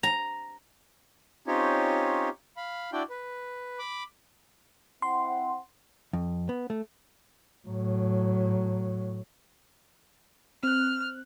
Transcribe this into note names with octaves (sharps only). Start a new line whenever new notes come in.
A#5
C4 C#4 D#4 F4 G4 C#5
F5 B5
D4 E4 F#4 D5 G5
B4
B5 D6
C4 E4 F#5 C6
F2
B3
A3
A2 F#3
C4 F6 F#6